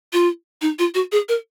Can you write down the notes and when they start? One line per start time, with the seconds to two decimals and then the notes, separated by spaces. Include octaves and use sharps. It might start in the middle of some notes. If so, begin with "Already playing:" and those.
0.13 F4
0.62 D#4
0.79 F4
0.95 F#4
1.12 G#4
1.29 A#4